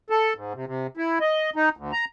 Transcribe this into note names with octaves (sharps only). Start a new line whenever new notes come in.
A4
G#2
C3
C3
E4
D#5
D#4
D2
A#5